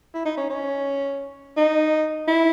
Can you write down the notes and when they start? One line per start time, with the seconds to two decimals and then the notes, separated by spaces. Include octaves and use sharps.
0.14 E4
0.25 D#4
0.37 C#4
0.50 C#4
1.57 D#4
2.28 E4